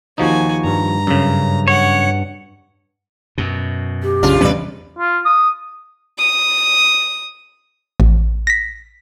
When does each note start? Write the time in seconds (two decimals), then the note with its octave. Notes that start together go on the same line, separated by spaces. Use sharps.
0.18 D#2 F3 D#4 F#4 G#5
0.64 G2 A#5
1.07 F#2 C#3
1.68 C#5 F#5
3.38 F#2 B2
4.03 G4
4.23 B1 C#3 D4 F4
4.41 E2 C3 G3 C#4 B4 D5
4.99 F4
5.25 D#6
6.18 D#6
8.00 A1
8.47 A#6 B6